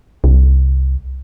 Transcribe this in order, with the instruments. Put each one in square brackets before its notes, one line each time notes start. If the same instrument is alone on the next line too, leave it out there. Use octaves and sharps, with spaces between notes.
[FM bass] C2